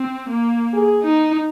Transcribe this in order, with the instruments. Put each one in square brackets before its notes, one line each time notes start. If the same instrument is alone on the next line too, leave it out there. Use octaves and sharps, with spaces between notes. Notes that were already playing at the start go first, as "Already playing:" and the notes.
Already playing: [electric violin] C4
A#3
[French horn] G#4
[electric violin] D#4